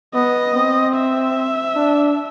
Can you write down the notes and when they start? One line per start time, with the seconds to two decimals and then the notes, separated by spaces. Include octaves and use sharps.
0.14 B3 D#5
0.55 C4
0.95 E5
1.75 D4